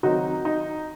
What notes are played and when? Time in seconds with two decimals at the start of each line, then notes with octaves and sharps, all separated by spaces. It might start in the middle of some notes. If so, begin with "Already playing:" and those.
0.03 D#3 F#3 C4 D#4 F#4
0.45 D#4